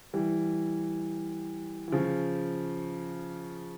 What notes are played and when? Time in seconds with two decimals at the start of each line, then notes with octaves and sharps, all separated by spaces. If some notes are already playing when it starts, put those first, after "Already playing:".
0.14 E3 G3
1.88 E3
1.92 C#3 F3